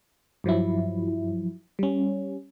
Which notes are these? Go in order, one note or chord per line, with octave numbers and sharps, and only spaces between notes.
G2 F3 F#3 E4
G3 C#4